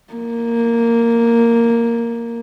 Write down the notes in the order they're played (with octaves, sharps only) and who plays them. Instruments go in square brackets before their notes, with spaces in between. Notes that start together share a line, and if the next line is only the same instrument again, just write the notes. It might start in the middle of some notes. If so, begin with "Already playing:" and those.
[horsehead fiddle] A#3